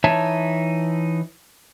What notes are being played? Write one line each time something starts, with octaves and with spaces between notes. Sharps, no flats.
E3 D#4 C#5 E5 A5